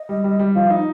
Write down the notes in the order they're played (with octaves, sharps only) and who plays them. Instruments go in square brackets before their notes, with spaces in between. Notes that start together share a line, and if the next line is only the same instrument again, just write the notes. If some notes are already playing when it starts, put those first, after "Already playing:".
Already playing: [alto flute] D#5
[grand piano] G3
G3
G3
[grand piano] F3 [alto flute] F5
[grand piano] D#4 [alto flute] D#5